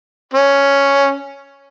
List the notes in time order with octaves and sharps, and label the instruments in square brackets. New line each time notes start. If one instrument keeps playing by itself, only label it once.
[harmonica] C#4